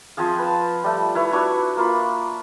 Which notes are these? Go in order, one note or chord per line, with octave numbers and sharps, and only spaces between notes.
F3 C4 G#4 F5
B4 A5
G3 A3
E4 B4 C#5
D4 F#4 B4 C#6
A#3 F4 B5